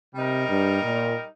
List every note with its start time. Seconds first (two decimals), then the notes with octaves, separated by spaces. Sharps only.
0.15 C3 G3 D#4 A#4
0.49 G2
0.83 A#2